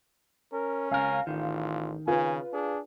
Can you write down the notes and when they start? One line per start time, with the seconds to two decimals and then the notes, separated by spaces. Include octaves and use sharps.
0.53 C#4 A#4
0.91 C#2 A#4 F5 G#5
1.27 A1 D#3 F4
2.07 C#3 F4 B4 G#5
2.53 D4 G#4